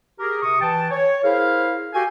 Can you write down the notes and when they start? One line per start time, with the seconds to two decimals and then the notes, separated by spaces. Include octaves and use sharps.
0.19 G4 G#4 A#4
0.43 C3 C#6 D#6
0.61 E3 G5 A5
0.90 C#5
1.24 E4 G#4 A#4 C5 F5
1.94 F#4 G4 A4 F5 G5 G#5